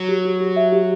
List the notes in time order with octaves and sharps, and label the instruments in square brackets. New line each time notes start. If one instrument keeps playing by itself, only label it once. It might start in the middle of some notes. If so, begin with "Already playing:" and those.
Already playing: [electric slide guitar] F#3
[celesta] G4
G4
G4
E5
G4